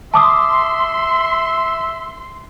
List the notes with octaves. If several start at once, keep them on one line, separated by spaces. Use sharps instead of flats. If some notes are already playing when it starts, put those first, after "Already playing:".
E5 A5 C6 D6 D#6